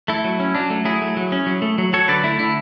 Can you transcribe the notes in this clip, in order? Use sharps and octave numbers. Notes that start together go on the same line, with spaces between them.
A3 E4
F#3
C#4
F#3 D4
A3
F#3 E4 G#4
A3
F#3
C#4
F#3
A3
F#3
F#3 A4 C#5
D3 B4 D5
A3 E4
D3 E4